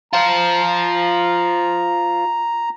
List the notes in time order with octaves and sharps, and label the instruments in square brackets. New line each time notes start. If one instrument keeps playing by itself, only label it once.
[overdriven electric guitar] F4 C5 [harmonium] A#5